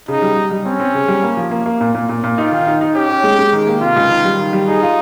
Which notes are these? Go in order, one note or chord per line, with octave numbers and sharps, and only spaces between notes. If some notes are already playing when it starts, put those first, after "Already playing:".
C#3 D#4
G3
G3
G3
C4 C#4
C4
C#3
G3
A#3
F3
A#3
A#3
A#2
A#2
A#2
A#2
D#4 F4
D#3
D#4
D#4
C#4 G4
C#4
G#3
G#3
D#3
A#3
C3 F4
C#2
D#3
G3
D#3
G3
D#4 G#4
F4